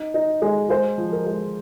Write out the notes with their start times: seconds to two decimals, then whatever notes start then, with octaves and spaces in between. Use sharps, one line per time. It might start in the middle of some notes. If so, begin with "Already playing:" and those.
Already playing: D#4
0.14 D#4
0.42 G#3
0.69 G#3 C5
0.98 F3
1.12 A#4
1.26 G#3